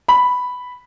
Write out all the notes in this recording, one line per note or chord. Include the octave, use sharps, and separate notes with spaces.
B5